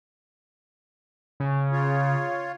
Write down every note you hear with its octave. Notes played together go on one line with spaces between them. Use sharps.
C#3
F4 C#5